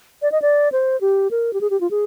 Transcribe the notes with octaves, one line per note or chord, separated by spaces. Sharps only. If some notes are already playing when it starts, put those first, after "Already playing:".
D5
D#5
D5
C5
G4
A#4
G4
G#4
G4
F4
G#4